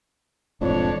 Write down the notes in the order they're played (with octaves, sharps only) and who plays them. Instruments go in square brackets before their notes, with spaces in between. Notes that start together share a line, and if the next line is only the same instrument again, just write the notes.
[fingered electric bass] E1 A1 G#2 [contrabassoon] F2 [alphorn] D4 [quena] C#5